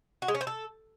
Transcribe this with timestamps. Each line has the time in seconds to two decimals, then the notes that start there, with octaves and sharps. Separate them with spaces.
0.22 F#4
0.28 G#3
0.35 C#4
0.41 C5
0.47 A4